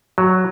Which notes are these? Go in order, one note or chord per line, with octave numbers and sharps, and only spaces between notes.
F#3